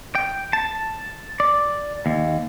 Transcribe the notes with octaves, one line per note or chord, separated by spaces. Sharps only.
G5
A5
D5
D#2